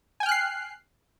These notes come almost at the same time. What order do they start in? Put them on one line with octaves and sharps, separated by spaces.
G#5 G5 F6 F#6 C7